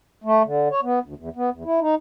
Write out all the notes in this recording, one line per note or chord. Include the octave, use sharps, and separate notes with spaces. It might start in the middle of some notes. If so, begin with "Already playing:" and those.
A3
D3
C#5
B3
D2
E2
B3
E2
E4
D#4